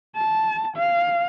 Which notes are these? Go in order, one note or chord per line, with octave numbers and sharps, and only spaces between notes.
A5
F5